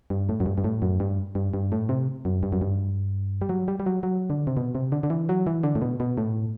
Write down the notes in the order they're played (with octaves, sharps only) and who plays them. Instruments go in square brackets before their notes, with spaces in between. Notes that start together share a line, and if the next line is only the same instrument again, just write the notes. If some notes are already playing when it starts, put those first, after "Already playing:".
[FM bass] G2
A2
F#2
G2
G2
A2
F#2
G2
G2
G2
A2
C3
F#2
G2
F#2
G2
G3
F#3
G3
G3
F#3
F#3
D3
C3
B2
C3
D3
D3
E3
F#3
E3
D3
A2
B2
B2
A2